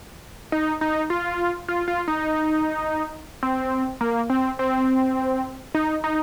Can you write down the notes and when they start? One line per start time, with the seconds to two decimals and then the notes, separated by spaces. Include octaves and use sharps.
0.52 D#4
0.81 D#4
1.10 F4
1.69 F4
1.88 F4
2.08 D#4
3.43 C4
4.01 A#3
4.30 C4
4.59 C4
5.75 D#4
6.04 D#4